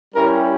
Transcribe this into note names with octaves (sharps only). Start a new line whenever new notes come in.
G3 C#4 E4 G4 A#4